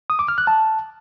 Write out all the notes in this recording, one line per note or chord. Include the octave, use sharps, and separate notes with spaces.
D#6
D6
F6
F#6
A5